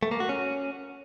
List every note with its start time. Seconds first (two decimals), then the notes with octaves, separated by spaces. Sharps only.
0.03 A3
0.11 A#3
0.20 F#4
0.29 C#4